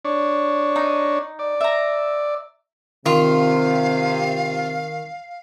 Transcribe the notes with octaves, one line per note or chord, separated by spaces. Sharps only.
D4 C#5
D#4
D5
E5 A#5
C3 D#3 F4 F5